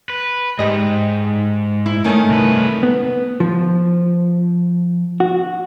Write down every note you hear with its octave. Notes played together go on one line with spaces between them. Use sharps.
B4
G#2 D#4 G4 D#5
E4
D#3 A3 C#4
C2 B4
B3
F3
F#4